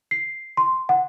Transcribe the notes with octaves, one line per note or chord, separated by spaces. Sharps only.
C7
C6
F#5